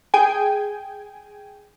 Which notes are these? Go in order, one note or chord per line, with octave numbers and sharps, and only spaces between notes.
G#4 G5 G#5